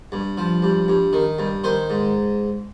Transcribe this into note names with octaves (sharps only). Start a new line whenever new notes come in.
G2
F3
G2
G2
D#3
G2
D#3 C5
G#2